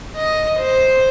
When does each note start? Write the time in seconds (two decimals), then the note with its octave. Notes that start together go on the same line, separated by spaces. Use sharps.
0.16 D#5
0.60 C5